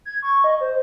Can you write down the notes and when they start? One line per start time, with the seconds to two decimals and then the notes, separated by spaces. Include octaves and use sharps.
0.05 G#6
0.22 C#6
0.44 D#5
0.61 C5